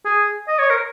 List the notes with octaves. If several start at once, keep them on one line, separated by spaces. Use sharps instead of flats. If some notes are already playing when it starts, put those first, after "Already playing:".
G#4
D#5
C#5
A#4